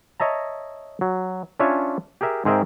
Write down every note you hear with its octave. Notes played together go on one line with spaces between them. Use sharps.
C#5 D#5 E5 A5 A#5
F#3
C#4 D4 F4 C#5 E5 G#5
G4 G#4 A#4 E5
G#2 C4 G#4 A#4 E5 G5